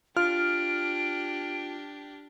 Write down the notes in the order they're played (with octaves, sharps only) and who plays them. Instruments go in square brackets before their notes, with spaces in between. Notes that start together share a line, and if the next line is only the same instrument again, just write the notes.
[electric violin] D4 G4 [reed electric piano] F4 [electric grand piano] F6 [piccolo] D7